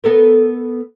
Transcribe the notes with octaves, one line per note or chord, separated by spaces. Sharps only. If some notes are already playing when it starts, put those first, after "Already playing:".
B3 A4 A#4